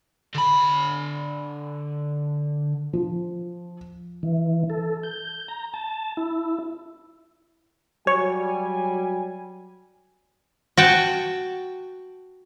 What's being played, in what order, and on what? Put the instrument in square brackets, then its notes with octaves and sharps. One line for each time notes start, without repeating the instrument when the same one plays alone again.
[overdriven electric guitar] D3 B5
[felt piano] F3
[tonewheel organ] E3
A4
G6
A#5
A5
E4
[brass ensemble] F#3 G3 G#5 [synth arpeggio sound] C#5
[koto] F#4 G5 A5